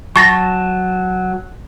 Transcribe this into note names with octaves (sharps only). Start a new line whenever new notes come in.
F#3 A5 C#6 A6 A#6